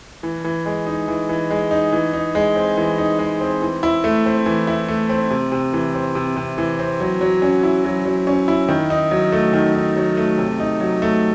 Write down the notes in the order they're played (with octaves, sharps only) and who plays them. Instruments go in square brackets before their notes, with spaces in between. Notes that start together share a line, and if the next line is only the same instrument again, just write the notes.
[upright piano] E3
E3
G#3
D#4
E3
E3
G#3
D#4
E3
D#4
G#3
C4
E3
D#4
G#3
C4
E3
E4
A3
C4
E3
E4
A3
C4
C3
C3
E3
C4
C3
C3
E3
C4
F#3
F#3
C#4
E4
F#3
F#3
C#4
E4
D#3
D#4
F#3
A3
D#3
D#4
F#3
A3
C3
D#4
F#3
A3